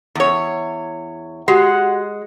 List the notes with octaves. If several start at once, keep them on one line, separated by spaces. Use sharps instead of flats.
E2 C#5
G#3 F#4 G4 F#5 C7